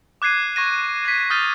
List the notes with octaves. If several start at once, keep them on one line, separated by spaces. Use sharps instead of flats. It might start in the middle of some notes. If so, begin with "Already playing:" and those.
D6 F#6 G#6 C7 D#7
C#6 G#6 A#6 D#7
G#6 B6
D#6 F6 G6 A6 D#7